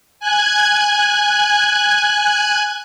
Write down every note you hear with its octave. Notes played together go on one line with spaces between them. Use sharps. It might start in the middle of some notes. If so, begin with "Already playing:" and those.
G#5 F#6 G#6